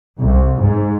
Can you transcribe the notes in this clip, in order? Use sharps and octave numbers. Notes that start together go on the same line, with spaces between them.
C2
G#2